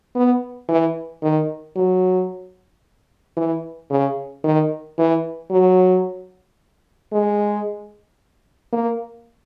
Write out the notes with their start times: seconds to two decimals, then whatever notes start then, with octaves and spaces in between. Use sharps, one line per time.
0.15 B3
0.69 E3
1.23 D#3
1.76 F#3
3.37 E3
3.90 C#3
4.44 D#3
4.98 E3
5.51 F#3
7.12 G#3
8.73 A#3